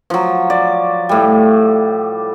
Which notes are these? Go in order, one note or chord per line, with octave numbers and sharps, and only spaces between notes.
F3 F#3
D5
A2 G3